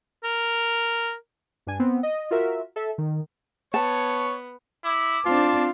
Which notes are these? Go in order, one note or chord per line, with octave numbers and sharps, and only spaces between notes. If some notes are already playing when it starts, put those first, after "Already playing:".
A#4
G2 D4 G#5
B3 C4
D#5
F4 F#4 A#4 E5
A4 E5
D#3
B3 C#5 A5
E4 D6
C4 D4 F4 A5